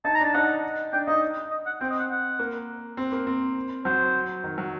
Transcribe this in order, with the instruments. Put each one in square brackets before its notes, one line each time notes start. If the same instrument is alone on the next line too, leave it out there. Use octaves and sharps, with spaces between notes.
[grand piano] D#4 [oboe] A5
[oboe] A#5
[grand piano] D4 [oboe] A5
[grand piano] D#4 [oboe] F#5
[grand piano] D4 [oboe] G5
[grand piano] D#4 [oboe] D#5
[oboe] D#5
F#5
[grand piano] C4 [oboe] G5
[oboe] D#5
F#5
F#5
[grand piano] A#3
C4
A#3
C4
[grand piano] F#3 [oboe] C5
[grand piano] D#3
F#3